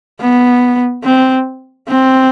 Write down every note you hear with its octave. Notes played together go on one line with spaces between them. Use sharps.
B3
C4
C4